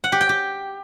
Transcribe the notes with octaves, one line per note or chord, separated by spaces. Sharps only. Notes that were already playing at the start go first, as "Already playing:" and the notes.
F#5
G4
G5
G4